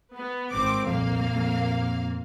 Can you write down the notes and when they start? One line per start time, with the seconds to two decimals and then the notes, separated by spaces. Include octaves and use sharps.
0.14 B3
0.53 G#1 C4 D6
0.86 C2 F2 A#2 A#3 F5
1.36 F2